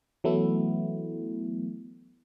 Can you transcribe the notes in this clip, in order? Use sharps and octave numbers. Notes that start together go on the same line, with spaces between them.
E3 F#3 A3 B3 E4